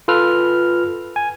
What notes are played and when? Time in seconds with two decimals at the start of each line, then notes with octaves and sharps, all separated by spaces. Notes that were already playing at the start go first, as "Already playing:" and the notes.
0.08 F4 A4 B4 F6
1.16 G#5